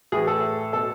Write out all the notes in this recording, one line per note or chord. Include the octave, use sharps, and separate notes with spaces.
A2 E3 G#4
A4
B2 A4